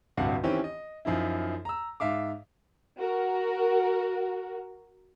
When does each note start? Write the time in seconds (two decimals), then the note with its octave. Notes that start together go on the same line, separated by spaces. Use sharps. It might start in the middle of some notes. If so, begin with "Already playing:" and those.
0.17 D1 G2 C3 F#4 F5 F#5
0.43 D#3 E3 C4 C#4 E4 G4
0.64 D#5
1.05 F#2 F3 D#4 E4
1.65 A#5 E6
2.00 G#2 E5 F5 D6
2.98 F#4 A#4